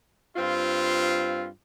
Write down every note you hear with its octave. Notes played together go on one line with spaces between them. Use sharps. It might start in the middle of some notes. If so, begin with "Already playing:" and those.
G2 C4 F4